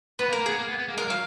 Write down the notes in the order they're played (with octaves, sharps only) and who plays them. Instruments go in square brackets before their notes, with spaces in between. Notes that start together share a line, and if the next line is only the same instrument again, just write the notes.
[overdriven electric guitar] B3 [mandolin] B4
[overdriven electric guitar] A#3
[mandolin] A#4
[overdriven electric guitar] A#3
[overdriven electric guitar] B3 [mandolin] G#4
[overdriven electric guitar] A#3
B3
B3
A#3
[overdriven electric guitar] G#3 [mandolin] A#4
[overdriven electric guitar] F#3 [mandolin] F5